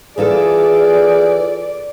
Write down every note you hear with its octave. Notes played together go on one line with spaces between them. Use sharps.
E3 F4 G#4 A4 D5